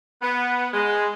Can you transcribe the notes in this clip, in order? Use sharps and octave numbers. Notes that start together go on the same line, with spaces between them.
B3
G#3